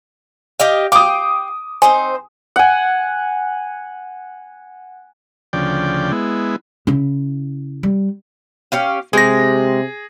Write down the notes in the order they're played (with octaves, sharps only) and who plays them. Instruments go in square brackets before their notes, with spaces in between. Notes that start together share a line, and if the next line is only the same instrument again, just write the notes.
[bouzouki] G4 D#5 F5
[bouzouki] F5 G5 [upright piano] D6 D#6
[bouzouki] C4 D#4 C5 [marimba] G#5
[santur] F#5 G#5
[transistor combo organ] D2 C#3 F3 D5 G5
G#3 B3 E4
[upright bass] C#3 E4
G3
[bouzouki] C#4 G4 F5
[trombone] C3 [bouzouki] G#3 G4 [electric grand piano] G#4 A#6